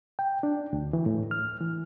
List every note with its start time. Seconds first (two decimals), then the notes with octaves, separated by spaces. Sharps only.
0.19 G5
0.43 D4
0.73 D2
0.93 E3
1.06 A2
1.31 F6
1.60 E3